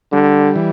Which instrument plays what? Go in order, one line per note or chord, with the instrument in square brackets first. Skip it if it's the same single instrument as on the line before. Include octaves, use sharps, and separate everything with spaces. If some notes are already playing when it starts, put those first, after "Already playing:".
[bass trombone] D3 [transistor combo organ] G3
[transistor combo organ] E3